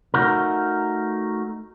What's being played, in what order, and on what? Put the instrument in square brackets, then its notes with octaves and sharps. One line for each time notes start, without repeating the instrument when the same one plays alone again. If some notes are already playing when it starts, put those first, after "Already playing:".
[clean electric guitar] A3 D#4 F#4 A#4